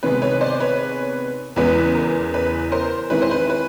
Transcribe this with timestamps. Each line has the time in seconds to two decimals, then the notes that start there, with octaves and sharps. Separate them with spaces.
0.03 C3 D#3 G#3 B3 B4
0.22 B4 C#5
0.41 C5 D5
0.60 B4 C#5
1.56 E2 C#3 E3 G#3 B3 B4
1.95 A#4
2.34 B4
2.72 A#4 C5
3.10 D#3 G#3 C4 E4 B4
3.22 C5
3.31 B4
3.50 B4